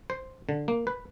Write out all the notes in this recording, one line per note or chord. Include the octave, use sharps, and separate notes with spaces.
C5
D3
A#3
B4